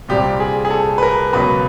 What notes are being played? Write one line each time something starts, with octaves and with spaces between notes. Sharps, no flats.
C2 A#2 G3 C4 G4
G#4
G#4
A4
B4
A#4
C#2 B2 F#3 B4